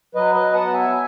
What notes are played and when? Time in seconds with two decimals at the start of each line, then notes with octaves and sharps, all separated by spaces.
0.15 F#3 B4 D#5
0.34 B4 D#5
0.54 B3 F#5 A5
0.73 E5 G#5